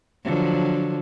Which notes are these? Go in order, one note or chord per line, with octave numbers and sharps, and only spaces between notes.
D3 F3 F#3